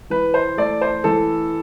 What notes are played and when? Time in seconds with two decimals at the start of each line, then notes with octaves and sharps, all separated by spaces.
0.10 E3 B4
0.34 C5
0.57 A3 D5
0.81 C5
1.04 E3 A4